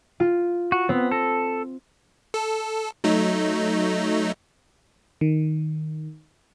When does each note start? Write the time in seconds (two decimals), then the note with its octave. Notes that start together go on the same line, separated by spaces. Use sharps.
0.20 F4
0.72 F#4
0.89 B3 C4
1.11 A4 A#6
2.34 A4
3.04 F#3 A3 D#4
5.21 D#3